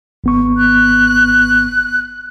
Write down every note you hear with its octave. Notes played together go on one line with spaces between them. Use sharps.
G#1 B3 C#6
F#6